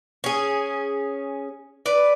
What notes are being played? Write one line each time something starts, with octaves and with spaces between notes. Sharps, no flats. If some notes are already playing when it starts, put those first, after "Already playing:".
C#4 G#4
B4 D5